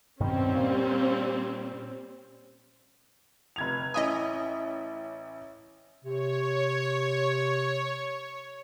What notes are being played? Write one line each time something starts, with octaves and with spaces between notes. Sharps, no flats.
G2 B2 D#3 G3 C4 C#4
A#2
F1 G#6 F7
A1 E4 D#5 E5 G#5 D#6
C3 C#5